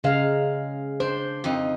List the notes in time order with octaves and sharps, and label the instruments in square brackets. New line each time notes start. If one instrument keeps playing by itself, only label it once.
[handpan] C#3 F5 [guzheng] G#3 A#5
[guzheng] D4 [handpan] C5
[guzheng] F2 D#4